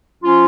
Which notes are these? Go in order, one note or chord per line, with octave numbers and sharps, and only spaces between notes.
F3 C#4 F4